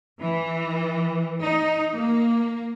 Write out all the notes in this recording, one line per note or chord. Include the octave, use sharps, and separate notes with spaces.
E3
D#4
A#3